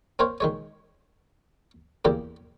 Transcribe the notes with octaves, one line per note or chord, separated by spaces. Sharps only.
C4 A#4 C5 C#5 F5
D#3 G#3 C#5
E2 C#3 A#3 G4